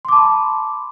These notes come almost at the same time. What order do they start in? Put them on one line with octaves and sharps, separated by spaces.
C6 D6 A5 B5